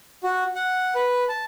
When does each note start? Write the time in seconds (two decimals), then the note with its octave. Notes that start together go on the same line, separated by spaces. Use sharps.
0.24 F#4
0.55 F#5
0.95 B4
1.29 A5